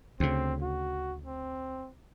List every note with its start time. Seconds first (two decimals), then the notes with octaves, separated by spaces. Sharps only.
0.20 D2 C#3 C4
0.61 F#4
1.26 C4